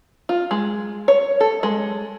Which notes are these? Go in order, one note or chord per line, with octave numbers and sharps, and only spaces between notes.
F4
G#3
C#5
A4
G#3